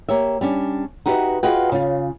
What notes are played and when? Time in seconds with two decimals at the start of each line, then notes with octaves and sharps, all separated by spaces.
0.09 A#3 G4 C#5 E5
0.41 G3 C#4 D4
1.06 D#4 F#4 G4 B4 D#5 E5
1.43 F4 F#4 G#4 B4 D#5 G5
1.72 C#3 F4